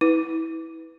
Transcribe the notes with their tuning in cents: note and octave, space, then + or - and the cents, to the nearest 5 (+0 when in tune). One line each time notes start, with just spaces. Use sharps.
E4 -25 B4 +0